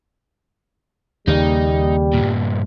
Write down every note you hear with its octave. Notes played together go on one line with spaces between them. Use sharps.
D#2 C#3 G3 A#3 D#4
G2 A#2